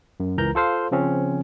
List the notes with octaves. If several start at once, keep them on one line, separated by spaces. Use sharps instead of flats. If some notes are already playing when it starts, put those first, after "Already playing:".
F#2
C#2 E3 A#4 A#5 G6
F4 A4 C5 F5
C#3 F3 C4 C#4